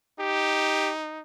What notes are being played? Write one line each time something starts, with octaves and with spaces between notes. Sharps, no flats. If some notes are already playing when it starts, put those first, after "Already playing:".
D#4 G4